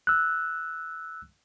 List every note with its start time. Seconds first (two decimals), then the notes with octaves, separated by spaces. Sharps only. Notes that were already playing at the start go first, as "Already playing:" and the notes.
0.07 E6 F#6